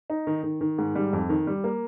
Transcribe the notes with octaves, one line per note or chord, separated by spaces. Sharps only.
D#4
D#3
D#3
D#3
G#2
G3
F2
D#3
G3
A#3